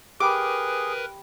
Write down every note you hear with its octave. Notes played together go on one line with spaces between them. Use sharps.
G4 G#4 A#4 B4 G5 B5 D6